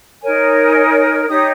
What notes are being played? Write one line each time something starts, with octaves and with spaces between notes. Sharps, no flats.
D#4 A#4 C#5 G#5
D#4 G4 C#5 D#6